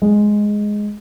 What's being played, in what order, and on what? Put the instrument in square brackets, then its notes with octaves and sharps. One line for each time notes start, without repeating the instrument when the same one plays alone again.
[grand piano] G#3